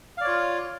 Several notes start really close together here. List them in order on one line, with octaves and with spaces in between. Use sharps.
F5 D5 C#5 F4